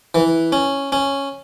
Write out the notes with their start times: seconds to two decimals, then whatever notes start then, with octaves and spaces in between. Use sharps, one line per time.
0.15 E3
0.52 C#4
0.92 C#4